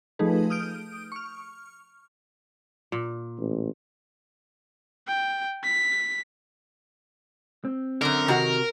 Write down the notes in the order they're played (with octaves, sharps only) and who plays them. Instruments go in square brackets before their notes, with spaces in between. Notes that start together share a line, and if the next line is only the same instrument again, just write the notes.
[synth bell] F3 A3 D#4 G#4 B4
D#6 F6 G6 D7
C#6 F6
[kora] A#2
[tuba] A1
[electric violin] G5
B6
[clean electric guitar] C4
[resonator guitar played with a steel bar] F#2 D3 [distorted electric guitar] A#4
[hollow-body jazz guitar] C3 F#4 F#5 [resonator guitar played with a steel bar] D#3 A#5